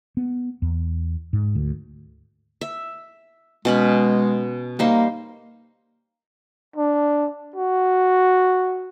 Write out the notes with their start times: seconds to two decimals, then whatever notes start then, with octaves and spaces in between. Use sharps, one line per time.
0.17 B3
0.62 E2
1.33 G#2
1.55 D2
2.61 E5
3.65 B2 G#3 C#4 B5
4.79 G3 A#3 D#4 C5
6.76 D4
7.56 F#4